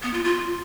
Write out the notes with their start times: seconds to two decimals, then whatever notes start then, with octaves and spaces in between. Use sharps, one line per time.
0.03 B3
0.14 F4
0.24 F4